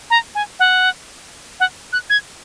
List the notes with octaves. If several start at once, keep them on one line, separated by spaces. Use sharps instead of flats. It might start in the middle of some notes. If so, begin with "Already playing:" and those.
A#5
G#5
F#5
F#5
F#6
G#6